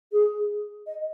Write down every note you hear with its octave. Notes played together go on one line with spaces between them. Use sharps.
G#4
D#5